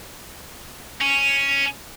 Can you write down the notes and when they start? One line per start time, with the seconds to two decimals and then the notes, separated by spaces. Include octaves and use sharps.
1.01 C#4